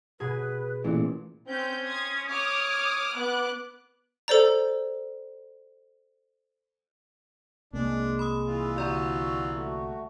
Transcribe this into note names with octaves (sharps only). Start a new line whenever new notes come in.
B2 G#4 B4
A1 A#2 E3
C4 C#4 G6
C6 D#6 G#6
C#5 D6 D#6 F6
B3 D6 F#6
A4 C5 D5 A#5
C2 G#3 A#3 D4
B5 D#6
E3 F4
D3 F#4 D5 A#5
A3 F#4